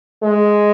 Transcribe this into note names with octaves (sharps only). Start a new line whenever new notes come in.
G#3